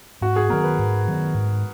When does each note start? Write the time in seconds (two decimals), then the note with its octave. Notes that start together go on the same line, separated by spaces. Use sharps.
0.21 G#2 F#4
0.36 G#4
0.49 D#3 F#3 B3 A#4
0.64 B4
0.78 G#2
1.07 D#3 F#3 B3
1.34 G#2